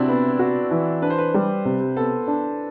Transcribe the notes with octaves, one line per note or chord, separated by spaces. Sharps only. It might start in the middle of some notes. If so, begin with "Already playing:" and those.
Already playing: C3 C4 D4 E4 F#4
B3
F#4
E3
D4 B4
C5
B4
G3
C3
B3 A4
D4